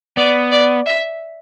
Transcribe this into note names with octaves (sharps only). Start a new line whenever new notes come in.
B3 D5
D5
E5